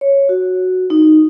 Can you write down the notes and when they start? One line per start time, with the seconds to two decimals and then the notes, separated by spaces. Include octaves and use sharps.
0.01 C#5
0.29 F#4
0.90 D#4